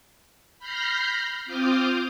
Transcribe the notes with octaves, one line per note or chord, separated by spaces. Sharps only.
B5 F6 G6 A#6 C7
C4 F4 D6 D#6 F6 G6